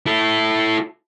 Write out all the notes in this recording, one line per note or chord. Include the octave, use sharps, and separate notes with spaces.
E4 A4